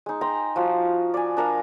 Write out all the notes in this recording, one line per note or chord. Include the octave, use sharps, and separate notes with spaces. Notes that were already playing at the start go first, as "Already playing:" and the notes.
G#3 D#4
G5 A#5 C6
F3 F#4 F5
D5 G#5
D4 A#4 F5